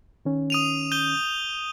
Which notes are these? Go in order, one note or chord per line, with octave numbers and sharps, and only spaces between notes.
D#3 C#4
D#6 D#7 F7
G6 D#7 G7